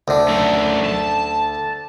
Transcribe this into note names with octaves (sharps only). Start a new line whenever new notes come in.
D2 D3
F#2 A3
A5